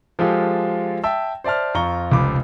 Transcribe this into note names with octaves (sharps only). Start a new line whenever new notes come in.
F3 G#3 F4 G4 A4
E5 G5 A5 E6
C5 D5 E5 A5 F6
F2 F4 A#5 C#6 G7
F1 C#2 F3 B5 D6